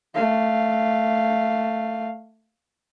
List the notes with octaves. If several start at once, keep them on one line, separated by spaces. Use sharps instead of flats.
A3 F5